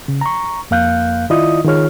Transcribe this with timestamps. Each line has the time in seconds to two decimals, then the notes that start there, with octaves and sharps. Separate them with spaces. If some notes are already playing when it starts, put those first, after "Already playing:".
0.08 C#3
0.21 A#5 C#6
0.71 F2 A#3 F5 F#6 G6
1.30 D#3 E4 F4 D5 D#5 D#6
1.65 D#3 F4 G#4 C#5 F6